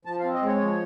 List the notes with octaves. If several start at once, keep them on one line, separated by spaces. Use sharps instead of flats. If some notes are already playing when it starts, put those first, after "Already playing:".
F3 A5
C4 F5
D#5
G#3 C#5
F3